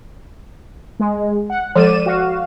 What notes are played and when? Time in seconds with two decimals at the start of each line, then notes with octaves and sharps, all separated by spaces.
1.00 G#3
1.50 F#5
1.76 F3 G#3 A4 D5 D#7 E7
2.06 F#4 F5